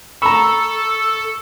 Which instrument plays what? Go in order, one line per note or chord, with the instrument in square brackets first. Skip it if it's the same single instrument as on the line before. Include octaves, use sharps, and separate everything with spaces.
[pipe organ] A4 [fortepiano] A#5 B5 [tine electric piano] C#6 E6